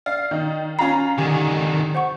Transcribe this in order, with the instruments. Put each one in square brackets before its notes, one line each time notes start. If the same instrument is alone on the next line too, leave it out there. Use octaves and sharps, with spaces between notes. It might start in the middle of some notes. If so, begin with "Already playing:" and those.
[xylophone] D5 [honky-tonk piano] F5
[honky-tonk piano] D#3 D#4
[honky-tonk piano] C#4 F4 A#5 [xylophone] C7
[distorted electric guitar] D3 D#3 [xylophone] G4 [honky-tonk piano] G#5
[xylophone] C5 F#5 C#6